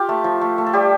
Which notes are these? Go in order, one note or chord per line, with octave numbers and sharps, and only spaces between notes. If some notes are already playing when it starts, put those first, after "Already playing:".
Already playing: F4 G4
A3
F3
A3
A3
A4
G3 G4